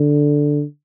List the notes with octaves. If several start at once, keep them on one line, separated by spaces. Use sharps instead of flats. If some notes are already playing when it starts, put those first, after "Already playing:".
Already playing: D3